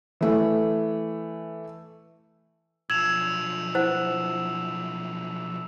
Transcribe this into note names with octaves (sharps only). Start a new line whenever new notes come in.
E3 A3
B1 F3 E6 G#6 E7 F7
E4 C5 F#5